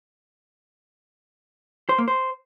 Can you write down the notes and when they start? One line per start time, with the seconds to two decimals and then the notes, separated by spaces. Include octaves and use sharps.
1.89 C5
1.98 A#3
2.08 C5